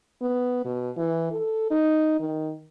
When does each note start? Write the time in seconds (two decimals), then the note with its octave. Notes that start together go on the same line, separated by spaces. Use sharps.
0.22 B3
0.65 B2
0.97 E3
1.32 A4
1.71 D#4
2.20 D#3